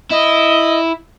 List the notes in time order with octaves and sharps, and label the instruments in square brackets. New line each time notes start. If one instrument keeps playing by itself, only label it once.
[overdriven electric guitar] E4 [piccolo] D#5